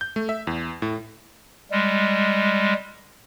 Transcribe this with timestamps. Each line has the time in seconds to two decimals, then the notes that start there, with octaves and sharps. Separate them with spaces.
0.01 G6
0.16 A3
0.29 E5
0.47 E2
0.82 A2
1.71 G3 G#3